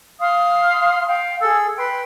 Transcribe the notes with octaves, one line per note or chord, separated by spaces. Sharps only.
F5 C6 D#6 F6
F5 G5
G#4 A4 E6
B4 G5 C6